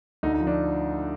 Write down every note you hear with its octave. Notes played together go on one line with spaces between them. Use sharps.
D2 D#4
D#4
F3
D4